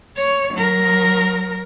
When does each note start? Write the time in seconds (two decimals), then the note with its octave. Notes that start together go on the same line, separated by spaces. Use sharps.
0.17 C#5
0.54 F#3 A#4